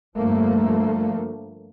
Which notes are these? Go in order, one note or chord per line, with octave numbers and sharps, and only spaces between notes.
G2 D3 F3 A3 A#3